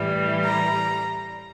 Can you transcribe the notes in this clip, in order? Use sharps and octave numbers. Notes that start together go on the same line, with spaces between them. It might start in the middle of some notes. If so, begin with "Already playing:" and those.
Already playing: A2 E3 G3
A#5